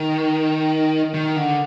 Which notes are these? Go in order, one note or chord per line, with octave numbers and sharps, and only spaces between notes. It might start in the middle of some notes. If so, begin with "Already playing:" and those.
Already playing: D#3
D#3
D3